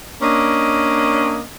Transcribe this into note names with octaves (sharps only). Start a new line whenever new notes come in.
A#3 C#4 D4 D#5